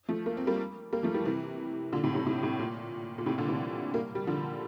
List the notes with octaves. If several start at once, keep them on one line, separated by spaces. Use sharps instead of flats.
F3 A3
A#3
C4
G3 A#3
G3 A#3
F3 A3
E3 G3
C3 E3
A#2 D3
A2 C3
A2 C3
A2 C3
A2 C3
A#2
A#2
A2 C3
A#2 D3
C3 E3
G3 A#3
G3
D3 F3